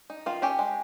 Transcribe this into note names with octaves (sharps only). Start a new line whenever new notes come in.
D#4
D#3 F4
C#4 G4
G#3